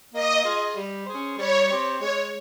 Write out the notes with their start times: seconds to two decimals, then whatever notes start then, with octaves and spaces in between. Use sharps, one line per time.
0.13 A#3 D#5
0.44 F4 G#4
0.75 G3
1.05 C#4 G#4 C5
1.37 G3 C#5
1.69 C4 G4
1.99 G#3 C#5